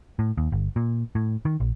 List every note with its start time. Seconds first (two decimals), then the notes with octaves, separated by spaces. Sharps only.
0.19 A2
0.38 D#2
0.52 G1
0.76 A#2
1.15 A2
1.45 D#3
1.60 A#1